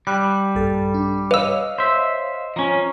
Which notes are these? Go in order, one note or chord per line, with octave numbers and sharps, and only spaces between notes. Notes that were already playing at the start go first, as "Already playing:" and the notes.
G3 F#6
A#1 G2 A4
D4
B4 C#5 D#5 F5 E6
C5 E5
F3 C#4 A#5